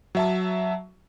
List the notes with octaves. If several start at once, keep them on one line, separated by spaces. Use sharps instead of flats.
F#3 E5 A5